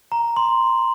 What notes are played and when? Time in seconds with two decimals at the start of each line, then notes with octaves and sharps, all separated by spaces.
0.12 A#5
0.37 C6